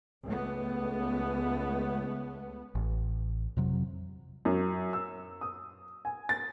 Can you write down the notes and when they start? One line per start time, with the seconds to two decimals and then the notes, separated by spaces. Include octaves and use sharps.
0.24 C#2 A3 B3
2.75 A1
3.57 F2 C3 F#3
4.45 F#2
4.93 E6
5.41 D#6
6.05 G#5
6.29 A6